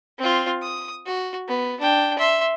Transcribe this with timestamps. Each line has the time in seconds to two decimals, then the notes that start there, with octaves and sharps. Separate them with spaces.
0.19 C4 F4
0.62 D#6
1.06 F#4
1.48 B3
1.80 D4 G5
2.19 E5 C6